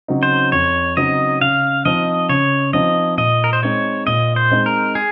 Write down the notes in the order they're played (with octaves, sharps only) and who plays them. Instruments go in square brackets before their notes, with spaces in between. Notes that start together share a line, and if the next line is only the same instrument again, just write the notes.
[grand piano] C#3 F#3 C4 D#4
[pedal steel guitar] C5
[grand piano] F2 [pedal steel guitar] C#5
[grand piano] C#3 F#3 C4 D#4 [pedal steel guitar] D#5
[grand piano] C#3 [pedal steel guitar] F5
[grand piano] F3 C4 D#4 [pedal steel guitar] D#5
[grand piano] C#3 [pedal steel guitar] C#5
[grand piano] F3 C4 D#4 [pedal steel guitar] D#5
[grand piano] A#2 [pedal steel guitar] D#5
[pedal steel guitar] A#4
C5
[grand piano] G#3 C4 D#4 [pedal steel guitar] C#5
[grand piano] A#2 [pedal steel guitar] D#5
[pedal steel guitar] C5
[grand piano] G#3 C4 D#4
[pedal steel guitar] A#4
G#4